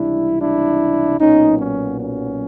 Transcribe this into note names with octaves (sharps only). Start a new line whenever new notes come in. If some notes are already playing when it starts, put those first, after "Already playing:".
Already playing: C#2 C3 E3 G3 D4 E4
D4 E4
B1 A#2 F#3 B3 C#4 D#4
C#4
C#4